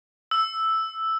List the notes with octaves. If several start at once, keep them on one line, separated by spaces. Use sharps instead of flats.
E6